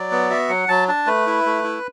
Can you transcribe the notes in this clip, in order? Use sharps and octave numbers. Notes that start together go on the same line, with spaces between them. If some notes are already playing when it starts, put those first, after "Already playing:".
Already playing: F#3 D5
B3
F#4 E5
F#3 F#5
F#3 A5
D4 A5
A3 B4
E4
A3
E4